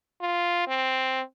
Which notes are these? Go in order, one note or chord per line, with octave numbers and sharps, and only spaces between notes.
F4
C4